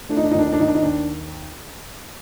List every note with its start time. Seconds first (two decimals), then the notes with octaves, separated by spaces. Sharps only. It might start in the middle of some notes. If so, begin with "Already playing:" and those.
0.09 A3 D4
0.17 D#4
0.23 D4
0.31 D#4
0.35 D#2 D4
0.46 D#4
0.53 D4
0.60 D#2 D#4
0.67 D4
0.75 D#4
0.82 D#2 D4